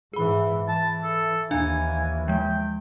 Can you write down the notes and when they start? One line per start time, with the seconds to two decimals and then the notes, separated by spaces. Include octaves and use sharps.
0.13 G#2 E3 G#4 B5
0.68 E3 A5
1.04 A4
1.51 D#2 E3 D4 F5 G#5
2.28 F3 G#3 G5